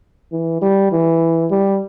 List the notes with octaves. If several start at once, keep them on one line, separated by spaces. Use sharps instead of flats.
E3
G3
E3
G3